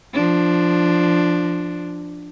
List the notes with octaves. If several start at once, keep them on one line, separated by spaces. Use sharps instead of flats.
F3 D4